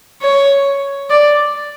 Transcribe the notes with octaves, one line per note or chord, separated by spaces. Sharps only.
C#5
D5